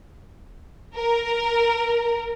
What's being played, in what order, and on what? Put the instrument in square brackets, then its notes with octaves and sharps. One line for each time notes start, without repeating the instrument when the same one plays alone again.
[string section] A#4